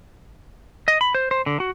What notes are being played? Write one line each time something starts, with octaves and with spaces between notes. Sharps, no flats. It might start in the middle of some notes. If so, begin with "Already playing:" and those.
D#5
B5
C5
C5
D3
F#4